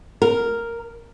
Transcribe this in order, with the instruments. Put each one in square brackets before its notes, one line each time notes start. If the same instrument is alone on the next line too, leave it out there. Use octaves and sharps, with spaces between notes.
[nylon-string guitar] A#4